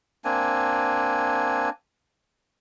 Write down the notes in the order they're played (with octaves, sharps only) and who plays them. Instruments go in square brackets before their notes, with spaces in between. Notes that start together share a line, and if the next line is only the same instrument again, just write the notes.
[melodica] A#3 C4 D4 G#5